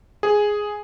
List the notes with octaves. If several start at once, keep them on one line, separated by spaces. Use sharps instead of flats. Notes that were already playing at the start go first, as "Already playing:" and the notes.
G#4